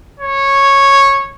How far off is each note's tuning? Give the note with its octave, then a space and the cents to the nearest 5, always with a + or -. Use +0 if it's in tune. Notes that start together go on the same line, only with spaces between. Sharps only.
C#5 -10